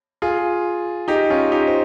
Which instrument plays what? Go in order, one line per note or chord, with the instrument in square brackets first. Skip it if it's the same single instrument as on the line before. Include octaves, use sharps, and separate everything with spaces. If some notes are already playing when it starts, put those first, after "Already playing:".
[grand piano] F4 G#4
D#4 G4
C#4 F4
D#4 G4
C5